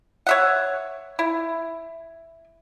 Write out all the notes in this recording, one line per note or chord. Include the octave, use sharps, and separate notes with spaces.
C#5 E5 F#5
E4